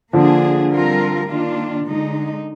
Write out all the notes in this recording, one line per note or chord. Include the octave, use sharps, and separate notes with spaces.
D3 F3 A#3 D4 G#4
G3 C4 F4 A#4
D#3 A#3 D4 F4
D3 G#3 D#4